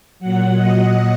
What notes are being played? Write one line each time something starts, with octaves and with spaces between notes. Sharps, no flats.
A#2 F#3 F#5
D#5